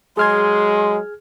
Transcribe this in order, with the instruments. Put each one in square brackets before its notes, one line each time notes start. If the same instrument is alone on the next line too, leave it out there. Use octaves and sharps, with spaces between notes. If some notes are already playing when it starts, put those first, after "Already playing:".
[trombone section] F#3 G#3 [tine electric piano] G#4 F6 G#6 [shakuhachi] C6